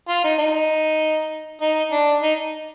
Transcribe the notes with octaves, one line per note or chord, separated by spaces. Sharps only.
F4
D#4
D#4
D#4
D4
D#4